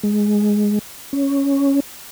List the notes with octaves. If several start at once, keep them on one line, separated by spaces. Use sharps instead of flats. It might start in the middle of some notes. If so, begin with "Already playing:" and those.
G#3
C#4